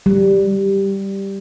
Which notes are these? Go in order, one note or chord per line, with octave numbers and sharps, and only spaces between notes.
G3